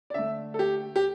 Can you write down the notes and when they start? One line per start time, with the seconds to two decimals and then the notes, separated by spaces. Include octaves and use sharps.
0.10 D5
0.14 D3 A3 E5
0.54 A4
0.59 G4
0.96 G4